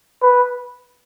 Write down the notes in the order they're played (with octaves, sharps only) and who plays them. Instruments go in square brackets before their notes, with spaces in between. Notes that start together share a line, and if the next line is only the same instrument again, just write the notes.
[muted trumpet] B4